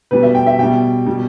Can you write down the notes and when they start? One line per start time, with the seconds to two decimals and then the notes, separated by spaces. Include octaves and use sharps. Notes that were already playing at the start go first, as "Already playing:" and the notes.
0.11 B2 G3 B4
0.23 E5
0.35 G5
0.46 E5
0.58 B2 G3 G5
1.06 B2 G3